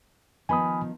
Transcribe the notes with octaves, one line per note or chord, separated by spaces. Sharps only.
D#3 F3 B3 G#5 B5 D#6